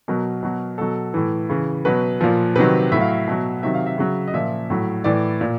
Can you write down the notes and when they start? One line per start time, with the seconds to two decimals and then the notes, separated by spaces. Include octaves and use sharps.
0.08 B2 F#3 A#4
0.43 B2 F#3
0.78 B2 F#3 A4
1.14 A2 E3
1.49 C#3 E3
1.85 B2 F#3 B4
2.21 A#2 F3
2.56 C3 D#3 F#3 B4
2.92 A2 E5
2.97 F#3 F5
3.11 E5
3.28 B2 F#3
3.63 C3 D#3 F#3 E5
3.74 F5
3.86 E5
3.98 C#3 F#3
4.28 D#5
4.34 A#2 F3 E5
4.70 A2 F#3
5.04 A2 E3 D5
5.41 A#2